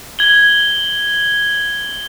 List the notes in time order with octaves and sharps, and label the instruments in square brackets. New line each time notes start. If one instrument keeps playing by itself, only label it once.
[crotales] G#6 F#7 G7